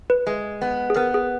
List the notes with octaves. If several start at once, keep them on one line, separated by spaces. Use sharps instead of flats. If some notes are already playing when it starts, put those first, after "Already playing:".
B4
G#3
B3
G#4
B3 A#4
G#4